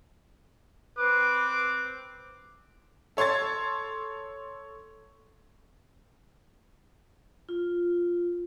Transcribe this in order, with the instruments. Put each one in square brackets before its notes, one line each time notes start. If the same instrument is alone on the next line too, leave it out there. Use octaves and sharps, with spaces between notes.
[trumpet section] C4 D6 [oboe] B4
[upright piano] A4 C#5 C6 G#6 A6
[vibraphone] F4